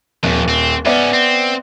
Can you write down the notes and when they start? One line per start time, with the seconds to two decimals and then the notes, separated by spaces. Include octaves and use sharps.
0.23 D#1 F2
0.49 C4
0.85 G#2 B3 C#4 D5 E5
1.13 C4